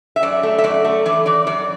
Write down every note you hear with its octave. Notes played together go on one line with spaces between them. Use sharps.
E5
F#2 D5
A3
E5
F#2 D5
A3
E3 D5
E3 D5
F#2 D5